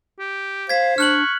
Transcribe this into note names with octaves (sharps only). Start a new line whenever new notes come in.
G4
C5 F5 G#6 B6
D4 C#6 F6 F#6 F#7